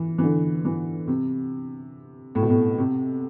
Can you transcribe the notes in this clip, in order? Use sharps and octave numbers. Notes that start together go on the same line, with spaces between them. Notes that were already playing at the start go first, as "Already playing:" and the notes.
Already playing: E3
E3
D3
E3
C3
A2
B2
A2
C3